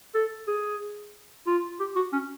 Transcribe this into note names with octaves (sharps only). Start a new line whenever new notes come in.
A4
G#4
F4
G4
F#4
C#4